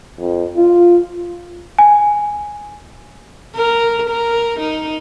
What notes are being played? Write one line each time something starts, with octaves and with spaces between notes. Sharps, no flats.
F2
F4
G#5
A#4
A#4
D#4